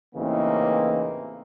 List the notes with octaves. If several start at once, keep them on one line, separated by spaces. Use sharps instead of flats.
A1 C#3 E3 A#3 C4 D#4